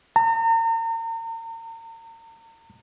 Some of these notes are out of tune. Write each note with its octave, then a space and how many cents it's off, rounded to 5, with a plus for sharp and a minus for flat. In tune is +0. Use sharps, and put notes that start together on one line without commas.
A#5 -40